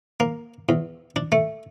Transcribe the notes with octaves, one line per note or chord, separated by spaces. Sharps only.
A#3
E2
D4
A3